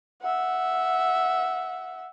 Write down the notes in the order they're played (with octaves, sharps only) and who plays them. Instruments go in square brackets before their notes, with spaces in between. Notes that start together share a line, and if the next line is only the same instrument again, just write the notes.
[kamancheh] E5 F#5